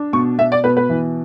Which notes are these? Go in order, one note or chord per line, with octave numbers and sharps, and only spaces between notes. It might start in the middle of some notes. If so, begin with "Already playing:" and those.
Already playing: D4
B2 C#6
B2 E5
D5
B2 B4
B4
E3